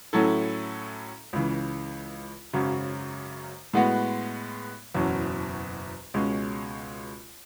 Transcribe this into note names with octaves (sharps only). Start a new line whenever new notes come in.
A2 F#3 C#4 E4 A4
C#2 C#3 E3
G#1 F#2 C#3 F#3 C#4
A2 G#3 B3 F#4
F#1 E2 B2 F#3 C#4
C#2 B2 G#3 C#4